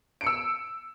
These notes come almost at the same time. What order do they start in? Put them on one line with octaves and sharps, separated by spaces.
D7 C#7 E6